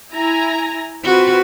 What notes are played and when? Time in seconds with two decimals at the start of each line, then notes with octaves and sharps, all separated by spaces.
0.11 E4 G#5 A#5
1.04 C4 F4 F#4 B4